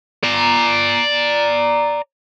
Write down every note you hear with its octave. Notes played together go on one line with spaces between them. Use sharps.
D5 A#5